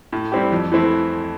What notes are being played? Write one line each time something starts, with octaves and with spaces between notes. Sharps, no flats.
A2
G3 C4 E4 G4
F2
E3 A3 C4 E4